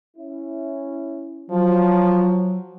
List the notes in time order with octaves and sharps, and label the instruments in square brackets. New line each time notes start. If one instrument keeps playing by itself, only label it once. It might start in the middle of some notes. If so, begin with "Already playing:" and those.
[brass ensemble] C#4 E4
[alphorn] F3 [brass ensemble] F#3